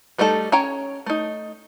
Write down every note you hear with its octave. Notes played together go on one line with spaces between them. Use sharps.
G3 A3 D#4 F#4 A4
C#4 C#5 G5 A#5
A3 D#4